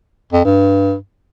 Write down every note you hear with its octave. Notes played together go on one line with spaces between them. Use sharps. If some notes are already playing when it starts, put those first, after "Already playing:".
F2
G2